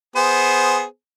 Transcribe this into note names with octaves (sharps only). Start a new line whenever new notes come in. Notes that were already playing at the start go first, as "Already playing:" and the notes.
B3 G#4 C5